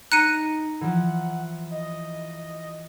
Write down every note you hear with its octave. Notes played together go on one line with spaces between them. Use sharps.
D#4 A#5 F#6 C#7 D#7
E3 F3 F#5
D#5